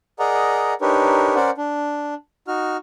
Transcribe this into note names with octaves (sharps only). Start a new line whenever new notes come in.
G#4 A#4 D5 D#5 F#5 A#5
D4 D#4 G4 A#4 B4 C#5
C#4 A#4 C5 D5 F#5
D4
D#4 F#4 F6